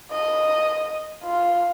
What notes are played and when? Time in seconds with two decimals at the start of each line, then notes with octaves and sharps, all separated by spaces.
0.12 D#5
1.24 F4